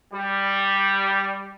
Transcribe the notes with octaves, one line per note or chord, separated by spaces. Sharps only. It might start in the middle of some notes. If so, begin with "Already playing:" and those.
G3